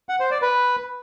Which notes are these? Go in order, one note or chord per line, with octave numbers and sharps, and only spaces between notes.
F#5
C5
D5
B4